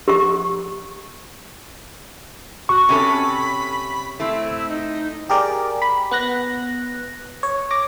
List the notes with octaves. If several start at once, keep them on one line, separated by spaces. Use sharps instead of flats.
G4 C#6
F#4 C#6
C3 C#4 A4 B5
A3 C4 E4
D#4
G4 G#4 A#4 D5
B5
B3 F#6 A#6
C#5
D6 A#6